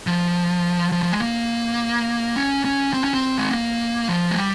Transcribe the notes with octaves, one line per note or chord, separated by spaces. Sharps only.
F3
F3
F3
G#3
A#3
C#4
C#4
C4
C#4
C4
G#3
A#3
F3
G#3
G3